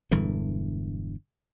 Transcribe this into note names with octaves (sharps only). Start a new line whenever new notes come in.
E1 G2 D3 E3